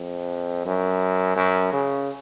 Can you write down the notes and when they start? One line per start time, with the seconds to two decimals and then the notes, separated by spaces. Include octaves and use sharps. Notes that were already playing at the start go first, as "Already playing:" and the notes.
Already playing: F2
0.66 F#2
1.36 F#2
1.72 C#3